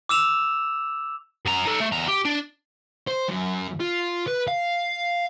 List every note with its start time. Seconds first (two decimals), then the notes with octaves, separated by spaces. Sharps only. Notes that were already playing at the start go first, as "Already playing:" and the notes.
0.09 D6 E6 E7 F7
1.46 F#2 A#5
1.66 D#4 A4
1.80 A3
1.92 E2 A#5
2.08 G4
2.25 D4
3.07 C5
3.28 F#2
3.80 F4
4.28 B4
4.48 F5